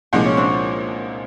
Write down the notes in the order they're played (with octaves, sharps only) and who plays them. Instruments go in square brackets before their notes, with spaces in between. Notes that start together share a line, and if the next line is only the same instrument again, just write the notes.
[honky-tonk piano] C2 A#2 F3 G#3 [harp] D4
[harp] C#4
C4 D4